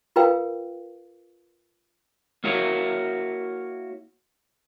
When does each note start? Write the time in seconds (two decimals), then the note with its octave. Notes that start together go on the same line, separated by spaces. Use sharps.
0.16 F4 A#4 B4 F5 G5
2.44 A#3 E4 F#4 C#5